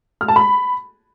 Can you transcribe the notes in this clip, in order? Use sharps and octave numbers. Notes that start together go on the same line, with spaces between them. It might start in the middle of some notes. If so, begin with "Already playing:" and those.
F6
A5
B5